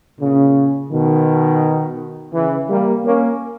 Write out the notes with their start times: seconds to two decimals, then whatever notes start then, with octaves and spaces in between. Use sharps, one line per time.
0.20 A#2 C#3
0.91 B2 D#3
2.33 C#3 E3
2.68 G3 A#3
3.04 A#3 C#4